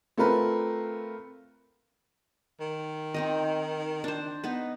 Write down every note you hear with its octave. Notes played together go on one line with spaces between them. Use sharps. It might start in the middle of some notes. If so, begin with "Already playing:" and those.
A3 C4 F4 A#4 B4
D#3
C4 D#4 D#5
D4 C5
B3 D#4 B4